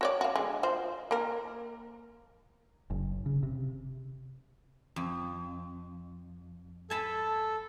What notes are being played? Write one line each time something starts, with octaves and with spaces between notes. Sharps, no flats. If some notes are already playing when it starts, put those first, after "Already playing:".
F#4 C#5 D5
F#4 F5
D3 G#3
F4 F#4 C5
A#3 A#4
F#1
C#3
C3
F2
A4 G#5 A5 B5